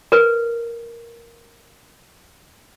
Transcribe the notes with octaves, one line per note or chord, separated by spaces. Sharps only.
A#4 B4